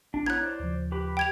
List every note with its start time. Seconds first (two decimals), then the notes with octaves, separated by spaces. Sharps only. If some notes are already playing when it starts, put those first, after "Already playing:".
0.14 A#1 D4
0.26 B3 E4 C#5 A#5 F#6 G#6
0.43 C5 D5
0.60 D#2 C#3 F3
0.92 G4 B4 B5
1.17 G5 G#6 F7